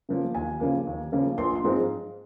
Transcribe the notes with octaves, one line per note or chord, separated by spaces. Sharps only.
C#3 F3 A#3
D#2 G#5
C#3 F3 A#3
D#2
C#3 F3 A#3
A#1 C6
C6
G#2 F3 G#3 C4